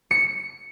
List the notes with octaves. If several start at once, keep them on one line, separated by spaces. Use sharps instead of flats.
C#7